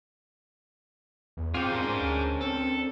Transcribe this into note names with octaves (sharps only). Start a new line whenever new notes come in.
E2
C4 F4 G4 G#4 C5
G#2 C#4 D4 A#4
D2
C4 A4